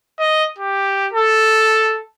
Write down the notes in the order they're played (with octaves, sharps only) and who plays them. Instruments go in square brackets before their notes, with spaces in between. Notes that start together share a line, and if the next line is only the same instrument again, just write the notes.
[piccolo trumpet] D#5
G4
A4